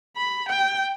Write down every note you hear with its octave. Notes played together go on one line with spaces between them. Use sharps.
B5
G5